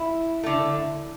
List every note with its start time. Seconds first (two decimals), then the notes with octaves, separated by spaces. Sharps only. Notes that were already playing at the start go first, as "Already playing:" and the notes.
Already playing: E4
0.43 D3 A3